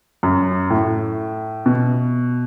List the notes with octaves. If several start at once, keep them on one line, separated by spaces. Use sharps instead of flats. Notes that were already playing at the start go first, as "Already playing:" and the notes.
F#2
A2
B2